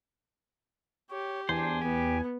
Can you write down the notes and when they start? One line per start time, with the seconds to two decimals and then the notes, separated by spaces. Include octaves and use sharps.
1.10 G4 C#5
1.49 E2 D4 C5 G#5
1.82 B3 G4